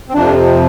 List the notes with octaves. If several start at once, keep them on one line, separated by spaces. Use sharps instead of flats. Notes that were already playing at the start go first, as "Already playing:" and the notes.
C4
F2 C3 F3 D4